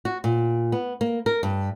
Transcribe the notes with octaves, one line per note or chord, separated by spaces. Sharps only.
F#4
A#2
B3
A#3
A#4
G2